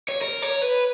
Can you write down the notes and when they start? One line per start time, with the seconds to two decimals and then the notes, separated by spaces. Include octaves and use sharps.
0.09 C#5
0.21 A#4
0.42 C#5
0.62 B4